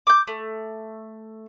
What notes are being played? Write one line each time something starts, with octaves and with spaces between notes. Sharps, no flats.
D6 G6
A3